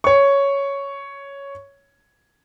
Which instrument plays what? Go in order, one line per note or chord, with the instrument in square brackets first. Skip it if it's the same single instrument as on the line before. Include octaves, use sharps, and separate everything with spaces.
[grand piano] C#5 C#6